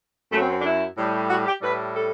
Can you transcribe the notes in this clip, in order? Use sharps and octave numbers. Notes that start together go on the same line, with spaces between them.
F#2 A3
F#3 C4
C4
D4
E4
A2 G3
F#4
G4
A2 G3 B4
A4